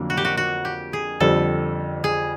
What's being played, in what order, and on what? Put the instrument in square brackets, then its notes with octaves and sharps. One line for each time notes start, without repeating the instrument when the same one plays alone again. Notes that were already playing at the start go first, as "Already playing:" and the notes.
Already playing: [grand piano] F2 D3 F#3 A#3
[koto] F#4
G4
F#4
F#4
G4
G#4
[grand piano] F2 D3 G3 C4 [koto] A4
[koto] G#4